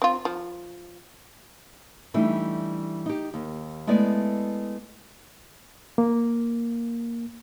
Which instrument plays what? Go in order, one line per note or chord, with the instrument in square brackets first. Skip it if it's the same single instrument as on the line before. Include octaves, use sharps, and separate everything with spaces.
[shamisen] C4 F4
F3
[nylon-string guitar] E3 G3 A3 D4 D#4
D#4 G4
D#2
G#3 A3 B3 E4 D5
[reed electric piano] A#3